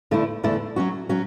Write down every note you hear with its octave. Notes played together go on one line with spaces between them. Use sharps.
E2 D3 A3 E4
E2 D3 A3 E4
F#3 C#4 F#4
F#3 C#4 F#4